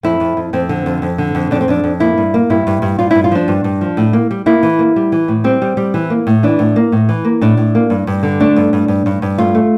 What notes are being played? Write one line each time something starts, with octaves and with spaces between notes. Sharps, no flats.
F2 E4
F2
F2
F2 C4
D3
F2
F2
D3
F2
F2 D4
C4
F2 D4
F2
A#3 E4
G2
A#3
G2 E4
G2
G2
G2 F4
E4
G2
F4
F3 D4
G2
G2
F3
A2
A#3
G3
A#3 E4
E3
A#3
G3
E3
A2
G3 C4
G3
G3
E3
A#3
A2
E3 D4
A2
A#3
A2
E3
A#3
A2 D4
A2
A#3
G2
G2
D3
A3 D4
G2
G2
G2
G2
G2
A3 F4
A3